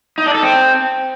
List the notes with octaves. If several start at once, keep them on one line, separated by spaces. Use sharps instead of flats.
D#4
D4
A4
C4